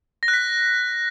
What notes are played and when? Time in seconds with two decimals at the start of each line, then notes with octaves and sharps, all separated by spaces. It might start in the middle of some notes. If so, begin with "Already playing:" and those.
0.23 A#6
0.28 F#6
0.34 B6